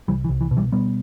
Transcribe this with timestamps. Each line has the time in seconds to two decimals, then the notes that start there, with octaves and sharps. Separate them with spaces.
0.08 C2 E3 G3
0.24 E3
0.29 C2
0.41 E3
0.51 B2
0.57 E3 G3
0.72 B2 G3 B3